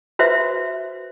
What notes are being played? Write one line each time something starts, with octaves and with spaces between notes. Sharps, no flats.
F#4 B4 C5 E5